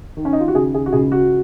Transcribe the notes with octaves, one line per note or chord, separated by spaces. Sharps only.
D#3
C#4
D#4
F4
F#4
C#3 G#4
G#4
F#4
C#2 G#4
F#4